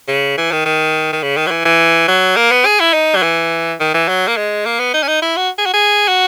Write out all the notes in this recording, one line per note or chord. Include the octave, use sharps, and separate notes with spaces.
C#3
E3
D#3
D#3
D#3
C#3
D#3
F#3
E3
E3
F#3
A#3
B3
G#4
E4
D#4
F#3
E3
D#3
E3
F#3
A#3
G#3
A#3
B3
D#4
C#4
D#4
E4
F#4
G#4
F#4
G#4
F#4